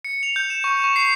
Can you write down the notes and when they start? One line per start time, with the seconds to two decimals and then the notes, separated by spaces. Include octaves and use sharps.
0.05 C#7
0.23 F7
0.36 G6
0.50 E7
0.64 C#6
0.84 C#6
0.96 C7